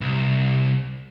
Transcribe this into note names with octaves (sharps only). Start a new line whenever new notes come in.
C2